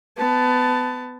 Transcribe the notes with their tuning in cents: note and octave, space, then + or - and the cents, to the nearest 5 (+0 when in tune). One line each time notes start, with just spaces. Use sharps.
B3 +25 A5 +0